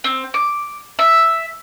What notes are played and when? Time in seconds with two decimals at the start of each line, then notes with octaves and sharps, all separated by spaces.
0.04 C4
0.34 D6
0.99 E5